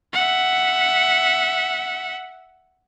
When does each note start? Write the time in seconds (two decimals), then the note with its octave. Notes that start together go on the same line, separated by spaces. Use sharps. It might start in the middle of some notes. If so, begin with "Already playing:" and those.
0.13 E5 F#5